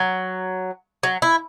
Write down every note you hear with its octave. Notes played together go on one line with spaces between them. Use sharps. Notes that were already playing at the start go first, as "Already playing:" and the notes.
Already playing: F#3
F#3
E4